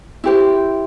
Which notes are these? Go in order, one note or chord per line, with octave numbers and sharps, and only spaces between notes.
E4 G4 C5